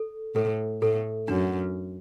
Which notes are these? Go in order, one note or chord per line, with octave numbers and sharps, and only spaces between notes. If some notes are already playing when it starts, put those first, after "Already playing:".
Already playing: A4
A2 A4
A2 A4
F#2 D4